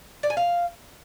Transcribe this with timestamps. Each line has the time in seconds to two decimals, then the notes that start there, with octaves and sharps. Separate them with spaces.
0.23 D5
0.30 G#5
0.37 F5